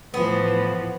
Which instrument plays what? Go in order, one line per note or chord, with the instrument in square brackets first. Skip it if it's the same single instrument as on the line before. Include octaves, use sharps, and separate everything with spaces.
[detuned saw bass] A2 [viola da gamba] E3 F3 [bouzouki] B3